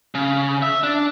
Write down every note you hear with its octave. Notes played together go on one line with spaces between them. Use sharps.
C#3
E5
D4